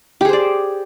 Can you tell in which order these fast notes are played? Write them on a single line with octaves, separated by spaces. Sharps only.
G4 G#4 C5 D5